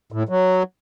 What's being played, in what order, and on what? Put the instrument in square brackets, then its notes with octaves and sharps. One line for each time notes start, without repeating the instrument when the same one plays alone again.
[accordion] A2
F#3